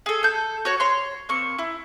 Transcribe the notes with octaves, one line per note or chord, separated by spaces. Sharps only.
G#4 A4
A4 G6
F#4 C#5 F#5
C#5 C6
A#3 C4 C#6
E4